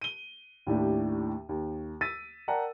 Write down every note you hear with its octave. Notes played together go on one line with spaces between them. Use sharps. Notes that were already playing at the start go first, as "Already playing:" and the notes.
D#7 G7
D#2 A2 D4 G4
D#2
E6 A6 B6 D#7
A#4 D5 F#5 G5 A5 A#5